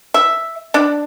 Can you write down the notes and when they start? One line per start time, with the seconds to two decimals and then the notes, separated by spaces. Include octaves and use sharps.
0.14 E5
0.74 D4